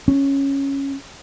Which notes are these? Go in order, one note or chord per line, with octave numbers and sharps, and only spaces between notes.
C#4